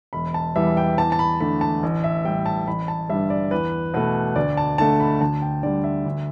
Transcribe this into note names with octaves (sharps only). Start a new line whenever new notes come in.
E1 B5
A5
E2 E3 G3 E5
G5
E2 A5
A5
B5
D3 A3 B5
A5
A1
E5
A2 G3 G5
A5
A1 B5
A5
G2 D3 G3 E5
D5
E2 B4
B2 A3 B4
D2 D5
A5
D3 A3 A5
B5
D2 A5
G5
D3 G3 D5
E5
D2